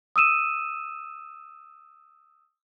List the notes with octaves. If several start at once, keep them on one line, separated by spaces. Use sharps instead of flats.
D#6 E6 D#7 E7